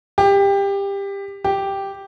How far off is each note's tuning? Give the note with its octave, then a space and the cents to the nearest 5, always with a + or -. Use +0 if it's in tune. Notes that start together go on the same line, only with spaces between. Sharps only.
G4 +20
G4 +0